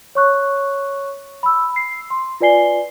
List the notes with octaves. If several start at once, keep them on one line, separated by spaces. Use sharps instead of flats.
C#5 C#6 F#6
B5 E6
C7
C6
F4 B4 D5 G#5 C7 G7